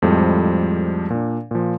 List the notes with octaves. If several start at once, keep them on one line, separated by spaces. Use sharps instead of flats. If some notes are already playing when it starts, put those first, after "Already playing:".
F2 A2 F3 G3 G#3
A#2 D4
A#2 F3